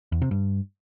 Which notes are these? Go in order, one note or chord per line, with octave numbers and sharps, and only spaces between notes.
E2
C3
G2